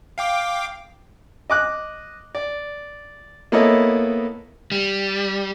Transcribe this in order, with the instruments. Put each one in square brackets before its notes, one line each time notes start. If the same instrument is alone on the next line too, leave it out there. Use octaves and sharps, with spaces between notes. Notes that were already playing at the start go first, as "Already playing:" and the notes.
[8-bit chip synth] F5 G5 D6
[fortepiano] D#5 D6 F#6
D5
A#3 B3 E4 A4 C#5 D#5
[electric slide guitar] G3